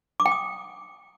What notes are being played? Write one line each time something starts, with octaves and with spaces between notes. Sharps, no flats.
D6
G5
D#6